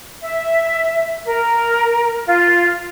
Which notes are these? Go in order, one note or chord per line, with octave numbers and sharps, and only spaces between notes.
E5
A#4
F4